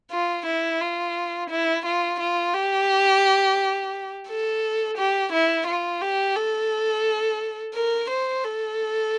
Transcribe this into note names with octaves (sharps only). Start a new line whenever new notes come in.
F4
E4
F4
E4
F4
F4
G4
A4
G4
E4
F4
G4
A4
A#4
C5
A4